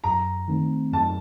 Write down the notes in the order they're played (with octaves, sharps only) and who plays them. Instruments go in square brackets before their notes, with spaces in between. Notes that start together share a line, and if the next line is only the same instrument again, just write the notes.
[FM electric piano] F#2 [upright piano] A#5
[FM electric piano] D#3 A3 C4
[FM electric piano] F#2 [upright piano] A5